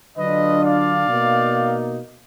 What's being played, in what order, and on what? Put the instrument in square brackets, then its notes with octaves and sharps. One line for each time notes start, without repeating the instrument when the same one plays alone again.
[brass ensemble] D3 F#3 D4 F4 B4 D#5
D5 F5
B2 A#3 D#4